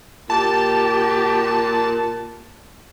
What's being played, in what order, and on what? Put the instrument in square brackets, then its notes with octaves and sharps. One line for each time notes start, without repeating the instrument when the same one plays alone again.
[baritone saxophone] A#2 [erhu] G4 [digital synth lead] A5